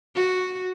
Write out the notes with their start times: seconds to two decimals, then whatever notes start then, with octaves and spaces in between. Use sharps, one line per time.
0.15 F#4